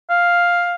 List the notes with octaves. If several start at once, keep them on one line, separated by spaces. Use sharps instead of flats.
F5